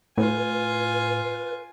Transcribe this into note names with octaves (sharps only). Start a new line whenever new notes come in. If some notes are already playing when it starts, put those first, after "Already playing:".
A2 F4 B4 G#5